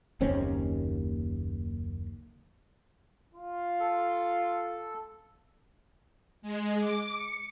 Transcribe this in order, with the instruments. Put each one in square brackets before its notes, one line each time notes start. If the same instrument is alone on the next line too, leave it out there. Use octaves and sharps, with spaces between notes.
[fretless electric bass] F#1 D#2 C4 C#4
[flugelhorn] F4
[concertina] A4
[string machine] G#3
D6
C#7